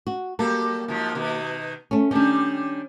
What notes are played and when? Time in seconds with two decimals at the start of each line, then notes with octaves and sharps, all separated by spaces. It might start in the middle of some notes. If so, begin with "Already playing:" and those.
0.07 F#4
0.39 F#3 G3 A#3 A4
0.88 G#2 F3 F#3
1.15 B2 D#3
1.91 A3 C#4
2.11 D#3 G3 C#4 D4